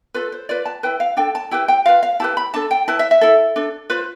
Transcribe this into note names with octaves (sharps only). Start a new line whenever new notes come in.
F4 A4 B4
C5
F4 B4 D5
A5
E4 B4 G5
F5
D4 A4 G5
A5
E4 G4 B4 G5
G5
F4 B4 F5
F5
E4 G4 B4 A5
B5
D4 A4 A5
G5
E4 B4 A5
E5
E5
E4 A4
D4 A4
F4 B4 C5